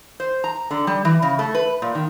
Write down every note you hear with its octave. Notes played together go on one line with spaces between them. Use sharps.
C5
A#5
D3
G3
E3
C#3
A3
B4
A#2
D#3